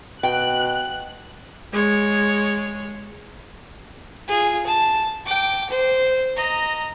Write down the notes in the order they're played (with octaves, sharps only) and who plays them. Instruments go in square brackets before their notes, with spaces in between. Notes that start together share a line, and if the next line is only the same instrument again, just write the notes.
[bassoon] B2 [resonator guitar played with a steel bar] G5 [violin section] F#6
[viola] G#3 C#5
[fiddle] F4 G#4
A5
G5 D6
C5
D#5 A#5